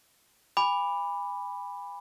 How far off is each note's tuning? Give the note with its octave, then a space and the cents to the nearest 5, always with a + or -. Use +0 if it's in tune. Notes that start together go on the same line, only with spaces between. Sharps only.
G#5 -40 B5 +0 D6 +5